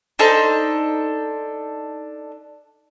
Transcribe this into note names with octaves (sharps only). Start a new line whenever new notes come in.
D4 D#4 A4 C5